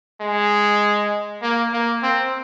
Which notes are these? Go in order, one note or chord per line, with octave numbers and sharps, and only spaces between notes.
G#3
A#3
A#3
C4